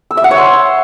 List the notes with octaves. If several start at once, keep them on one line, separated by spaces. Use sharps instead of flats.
E6
E5
F#5
C#5
C6